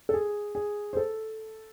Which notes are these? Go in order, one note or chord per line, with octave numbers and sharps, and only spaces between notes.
A4
G#4
G#4
C5
A4